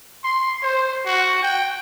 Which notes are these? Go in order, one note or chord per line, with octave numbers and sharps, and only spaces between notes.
C6
C5
F#4
G5